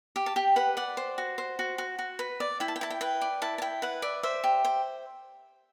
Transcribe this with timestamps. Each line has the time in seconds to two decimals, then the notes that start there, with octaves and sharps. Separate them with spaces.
0.16 G4
0.26 A5
0.36 G4 G5
0.56 B4 F#5
0.77 D5 F#5
0.97 C5
1.18 F#4
1.38 C5
1.59 F#4
1.78 F#4
1.99 F#4
2.19 B4
2.40 D5
2.60 E4 G5
2.68 A5
2.76 G5
2.81 E4 A5
2.90 G5
3.01 B4 G5
3.21 D5
3.42 E4 A5
3.58 A5
3.62 E4 G5
3.82 B4 F#5
4.02 D5 E5
4.23 C5 E5
4.44 G4
4.65 C5